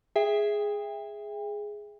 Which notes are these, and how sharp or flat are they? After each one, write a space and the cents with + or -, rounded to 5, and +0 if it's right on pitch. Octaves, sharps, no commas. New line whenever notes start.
G#4 +0 E5 +0 G5 +35